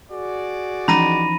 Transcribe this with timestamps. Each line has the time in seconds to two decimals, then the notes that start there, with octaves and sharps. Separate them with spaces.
0.11 F#4 G#4 D5
0.88 E3 F3 C#4 D#4 A#5 B5 A#6 D#7